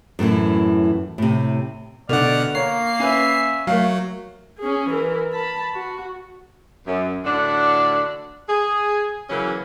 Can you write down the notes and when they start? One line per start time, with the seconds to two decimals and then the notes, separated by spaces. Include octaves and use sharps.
0.19 F#2 A2 D3 E3
1.18 A2 C3
2.09 B2 D3 A3 D5 F#5 F6
2.55 A#3 A#4 C#5 C7
2.99 C#4 B4 E5 G#5
3.67 F#3 A3 A#3 F5
4.59 C#4 G#4
4.89 E3 A#4
5.32 A5 B5
5.74 F#4
6.86 F#2
7.24 A2 D3 D4 F#4 F#5
8.48 G#4
9.29 C#3 E3 F#3 A#3 C#4